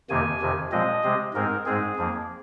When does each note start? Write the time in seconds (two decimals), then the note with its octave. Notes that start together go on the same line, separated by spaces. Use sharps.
0.10 F2 C3 D#3 A#3 G#5
0.41 F2 C3 D#3
0.72 A#2 F3 G#3 C4 D#5
1.03 C3 G#3 C4
1.34 G#2 G#3 C4 A#4
1.66 G#2 G#3 C4 G#4
1.96 F2 F3 A#3